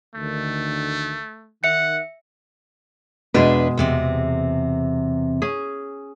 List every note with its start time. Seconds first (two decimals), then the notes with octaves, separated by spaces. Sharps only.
0.15 D2 D3 D#3 A3
1.64 D#3 E5 F#5 C#7
3.34 E2 B2 G#3 D4 G#4 B4
3.77 E2 C3 C4
5.42 C#4 G#4